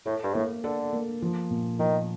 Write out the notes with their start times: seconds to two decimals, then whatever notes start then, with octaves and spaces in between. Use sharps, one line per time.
0.06 A2 A4
0.23 G2
0.34 A2 A#3
0.64 D3 A4
0.93 A#3
1.22 F3
1.51 A#2
1.79 D#3 F3